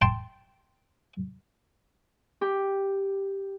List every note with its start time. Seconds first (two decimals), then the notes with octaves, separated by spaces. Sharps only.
0.02 G5 A5 C6
2.41 G4